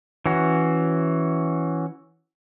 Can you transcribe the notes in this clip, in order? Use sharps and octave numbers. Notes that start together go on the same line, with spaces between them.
E3 C#4 F#4